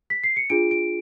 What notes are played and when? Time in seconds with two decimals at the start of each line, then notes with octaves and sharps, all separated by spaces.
0.10 B6
0.24 C7
0.36 C#7
0.50 D4 F4 G#4 D7
0.71 D7